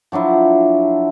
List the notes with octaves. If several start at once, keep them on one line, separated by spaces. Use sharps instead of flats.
F3 F#3 D4 E4